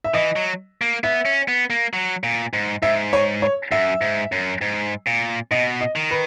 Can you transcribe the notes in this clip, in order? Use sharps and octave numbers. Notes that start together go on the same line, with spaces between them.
E5
E3 D#5
F#3
A#3
B3 E5
C#4
B3
A#3
F#3
A#2
G#2
G#2 E5
C#5
C#5
F#2 E5
G#2
F#2
G#2
A#2
B2 D#5
D#5
D#3
B4